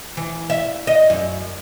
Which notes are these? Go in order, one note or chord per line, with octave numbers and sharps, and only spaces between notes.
E3
E5
D#5
F#2